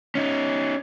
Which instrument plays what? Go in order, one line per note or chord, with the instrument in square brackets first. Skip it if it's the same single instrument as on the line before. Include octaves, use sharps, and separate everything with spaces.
[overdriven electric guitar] C#4 D#4